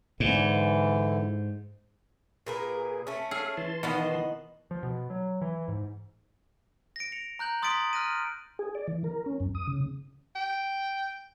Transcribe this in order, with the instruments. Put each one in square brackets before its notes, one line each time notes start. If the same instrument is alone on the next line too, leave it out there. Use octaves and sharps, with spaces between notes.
[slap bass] G#2 [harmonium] D3 E3
[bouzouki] A#2 A#4 B4 [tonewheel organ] G#4
[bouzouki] A3 C#4
[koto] G#4 [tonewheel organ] A4 F5
[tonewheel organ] E3 A5 C6
[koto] B2 D#3 B3 [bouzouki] D#5 F#5
[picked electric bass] F3
B2
F#3
E3
G#2
[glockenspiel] A#6 D7
A#6 C#7 F7
A#5 F#6 G6 F#7
C6 D#6 A6 B6 D7 F#7
F6 F#6 A#6 D#7
[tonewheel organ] G#4
D5
E3
A#4
C#4
F#2
D#6
C#3
[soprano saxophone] G5